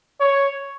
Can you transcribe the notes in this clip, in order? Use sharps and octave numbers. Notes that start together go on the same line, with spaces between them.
C#5